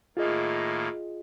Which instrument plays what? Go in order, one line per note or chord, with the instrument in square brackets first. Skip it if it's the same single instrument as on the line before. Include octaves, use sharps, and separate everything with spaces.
[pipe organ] A2 D#3 A#3 [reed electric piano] F4 G#4 D#5